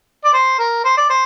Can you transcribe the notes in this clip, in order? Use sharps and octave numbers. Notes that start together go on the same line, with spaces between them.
D5
C5
A#4
C5
D5
C5